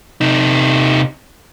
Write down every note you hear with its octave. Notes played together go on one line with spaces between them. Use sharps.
C3 D#4